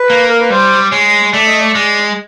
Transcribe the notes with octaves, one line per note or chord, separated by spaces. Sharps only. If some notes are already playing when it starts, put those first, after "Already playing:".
Already playing: B4
A#3
A#4
B4
G3 C5
G#3 C#5
A3 D5
D#5
D5
G#3